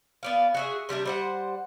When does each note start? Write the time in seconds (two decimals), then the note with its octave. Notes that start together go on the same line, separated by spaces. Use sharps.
0.23 B3 D5 F5
0.55 F#4 G#4 E5
0.89 C3 G3 D4 E5
1.05 G3 C5 F#5